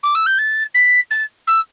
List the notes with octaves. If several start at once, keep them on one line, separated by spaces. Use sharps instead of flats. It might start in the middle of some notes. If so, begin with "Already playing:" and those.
D6
E6
G6
A6
B6
A6
E6